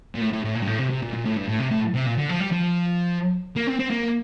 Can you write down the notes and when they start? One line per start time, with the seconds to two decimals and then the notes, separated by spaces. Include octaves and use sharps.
0.15 A#2
0.21 A2
0.33 A2
0.44 A2
0.55 A#2
0.62 G2
0.67 A2
0.79 C3
0.90 C3
1.02 A#2
1.13 A#2
1.26 A2
1.37 G2
1.48 A2
1.59 C3
1.71 A2
1.95 C3
2.06 A#2
2.18 D3
2.29 F3
2.40 G3
2.52 F3
3.57 A#3
3.67 C4
3.79 C4
3.91 A#3